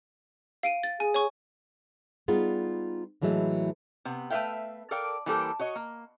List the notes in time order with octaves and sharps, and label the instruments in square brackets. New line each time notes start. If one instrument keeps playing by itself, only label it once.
[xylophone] F5 D7 D#7
A6
[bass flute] G#4 [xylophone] G#5
[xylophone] C#5 G#5 C#6
[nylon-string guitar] G3 B3 D#4 F4 G#4
A2 E3 F#3 G#3 A3
[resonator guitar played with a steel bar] C3 B3
A3 B4 C5 E5 F5 G5
A4 A#4 D5 F5 G5
E3 G3 A#3 G4 A4 C5
F#4 C#5 D#5
A#3